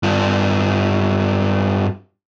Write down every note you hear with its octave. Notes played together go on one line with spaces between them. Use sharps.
G2 F4